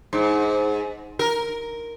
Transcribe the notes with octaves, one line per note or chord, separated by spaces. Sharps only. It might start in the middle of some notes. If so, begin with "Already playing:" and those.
G#2
A#4